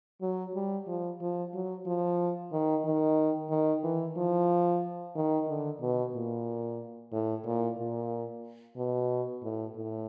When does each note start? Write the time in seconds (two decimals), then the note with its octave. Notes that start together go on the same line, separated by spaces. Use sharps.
0.21 F#3
0.55 G3
0.87 F3
1.21 F3
1.53 F#3
1.86 F3
2.52 D#3
2.85 D#3
3.50 D#3
3.83 E3
4.17 F3
5.16 D#3
5.48 D3
5.81 B2
6.14 A#2
7.12 A2
7.46 A#2
7.79 A#2
8.77 B2
9.43 A2
9.76 A2